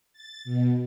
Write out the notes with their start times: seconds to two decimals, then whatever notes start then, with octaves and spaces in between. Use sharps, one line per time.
0.13 A6
0.44 B2